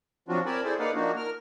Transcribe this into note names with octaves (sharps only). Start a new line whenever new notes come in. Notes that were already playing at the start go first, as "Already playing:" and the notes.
F3 F#3 C4 D4 F4 F#4
C4 A#4 D5 G#5 A5 B5
E4 G#4 A4 C5 D5
A#3 D#4 B4 D5 F5 F#5
F3 A#3 D4 D#4 F#4
A#4 F6